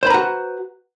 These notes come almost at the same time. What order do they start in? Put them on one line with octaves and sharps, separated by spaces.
C5 B4 A#5 F#4